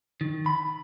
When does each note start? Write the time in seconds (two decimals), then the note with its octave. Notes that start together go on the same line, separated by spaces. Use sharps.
0.21 D#3
0.46 B5